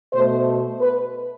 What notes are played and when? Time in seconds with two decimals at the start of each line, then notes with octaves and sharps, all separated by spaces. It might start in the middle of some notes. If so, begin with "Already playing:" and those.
0.13 B2 A3 C5
0.81 B4